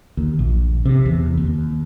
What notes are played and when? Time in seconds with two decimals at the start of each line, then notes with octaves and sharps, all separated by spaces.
0.17 D#2
0.39 A#1
0.86 C3
1.06 E2
1.38 D#2